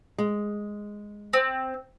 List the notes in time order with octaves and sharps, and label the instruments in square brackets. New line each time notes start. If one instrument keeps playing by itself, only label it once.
[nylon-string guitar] G#3
[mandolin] C4